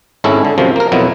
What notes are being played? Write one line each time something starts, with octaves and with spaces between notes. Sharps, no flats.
G#1 G#2 C#4 E4 A4
D3
F#2 C3 F3
A#3 A#4
F2 B2 F#3 E4